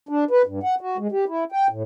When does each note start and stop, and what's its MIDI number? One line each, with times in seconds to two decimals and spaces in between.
0.09 0.24 62
0.31 0.42 71
0.46 0.59 43
0.63 0.75 78
0.81 0.97 66
0.98 1.07 56
1.12 1.25 67
1.28 1.44 64
1.52 1.67 79
1.70 1.83 45